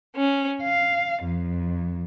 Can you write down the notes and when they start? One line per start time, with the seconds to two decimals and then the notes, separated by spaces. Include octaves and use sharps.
0.15 C#4
0.63 F5
1.23 F2